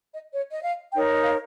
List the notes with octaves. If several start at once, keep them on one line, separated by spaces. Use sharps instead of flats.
D#5
C#5
D#5
F5
D#4 A#4 C#5 G5
D#5
F5